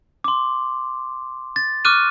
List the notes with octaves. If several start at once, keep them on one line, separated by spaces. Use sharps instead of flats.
C6 D6
A6
C#6 D6 F6 F#6 D#7